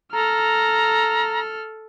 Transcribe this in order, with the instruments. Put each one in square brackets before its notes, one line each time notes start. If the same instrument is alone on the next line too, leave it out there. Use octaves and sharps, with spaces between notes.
[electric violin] A4 F6 [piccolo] A#5